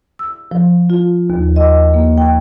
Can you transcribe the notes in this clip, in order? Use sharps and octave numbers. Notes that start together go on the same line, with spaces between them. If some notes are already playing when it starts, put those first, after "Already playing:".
E6
F3
F4
D#2
D#5
A#3
G5